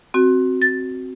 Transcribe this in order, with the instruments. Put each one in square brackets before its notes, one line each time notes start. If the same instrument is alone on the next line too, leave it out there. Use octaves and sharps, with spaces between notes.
[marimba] C4 F#4
A6